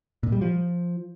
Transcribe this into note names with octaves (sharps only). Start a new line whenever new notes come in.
A#2
G3
F3